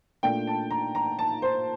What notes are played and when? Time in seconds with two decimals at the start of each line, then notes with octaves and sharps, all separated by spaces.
0.23 A#2 A3 D4 G5
0.47 A5
0.71 A#5
0.95 A#5
1.19 A5
1.42 C5